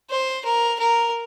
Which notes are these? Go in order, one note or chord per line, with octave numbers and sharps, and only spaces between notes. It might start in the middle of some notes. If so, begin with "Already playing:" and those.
C5
A#4
A#4